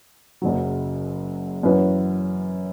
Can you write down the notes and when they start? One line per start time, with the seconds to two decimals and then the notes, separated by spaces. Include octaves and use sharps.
0.42 F#1 F#2 C#3 F#3
1.63 F#2 E3 C#4 F#4 B4